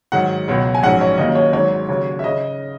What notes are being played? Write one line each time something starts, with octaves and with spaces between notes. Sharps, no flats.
G#2 D#3 F#3 F#5
C#2 B2 F#3
G#5
A#1 G#2 F#3 C#4 F#5
C#5
D#2 D#3 F#3 A#3 C#4 D#5
C#5
G#1 G#2 F#3 C#5
D#2 C#3 F#3
E5
C#3 D#5